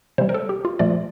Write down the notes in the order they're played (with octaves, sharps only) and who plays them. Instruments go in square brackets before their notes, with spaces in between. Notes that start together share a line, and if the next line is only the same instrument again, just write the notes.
[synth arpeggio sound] C3 E3 G3 C5
A#4
A4
G4
F4
A#2 F3 A3 D5